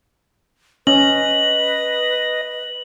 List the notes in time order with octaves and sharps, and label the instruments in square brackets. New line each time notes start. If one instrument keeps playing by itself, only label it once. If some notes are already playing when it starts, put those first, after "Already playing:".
[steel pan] C#4 [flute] B4 [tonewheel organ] D#5 A#6 [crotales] F#7